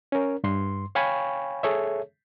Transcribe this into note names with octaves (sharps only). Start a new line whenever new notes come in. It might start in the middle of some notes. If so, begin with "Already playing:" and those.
C#4 A#4
G2 C6
C#5 F5 G5 G#5 B5 C#6
G#4 A4 C#5 E5